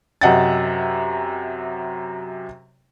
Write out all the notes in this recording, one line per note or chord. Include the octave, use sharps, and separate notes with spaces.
F#2 C3 D#5 F#5 G5 A6